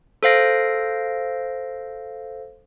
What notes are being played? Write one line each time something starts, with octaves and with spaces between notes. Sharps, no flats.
A4 C5 F5 A#6 D7